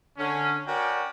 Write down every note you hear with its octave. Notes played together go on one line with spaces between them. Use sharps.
D3 C#4
C#4 F#4 A#4 C#5 D5 G5